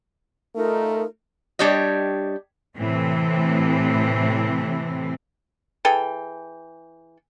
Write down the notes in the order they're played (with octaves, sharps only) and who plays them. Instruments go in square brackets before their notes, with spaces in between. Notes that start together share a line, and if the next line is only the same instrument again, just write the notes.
[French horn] A3 [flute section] D#4 F4 A#4
[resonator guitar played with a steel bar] G3 D4 G4 C#5 D#5
[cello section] A2 C3 E3 C4
[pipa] E3 G#4 A4 G5